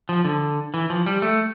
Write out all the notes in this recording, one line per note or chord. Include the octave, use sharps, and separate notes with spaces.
F3
D3
E3
F3
G3
A3